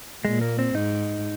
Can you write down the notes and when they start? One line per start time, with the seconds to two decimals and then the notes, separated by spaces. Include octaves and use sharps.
0.24 A#2 G#3
0.41 A#3
0.59 C4
0.75 G#2 D#4